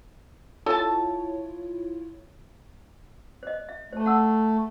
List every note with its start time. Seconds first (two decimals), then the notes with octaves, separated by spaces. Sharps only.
0.66 E4 F4 A4 C#5 A5
3.43 C5 D#5
3.69 E5
3.92 A3 C5 A5
4.06 F#5 A5 E6